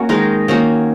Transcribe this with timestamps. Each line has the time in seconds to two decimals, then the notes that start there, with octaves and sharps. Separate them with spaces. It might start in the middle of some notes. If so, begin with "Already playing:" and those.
Already playing: A#3 C#4 F#4
0.09 D#3 G#3 D#4 A#4
0.48 D#3 A#3 C#4 F#4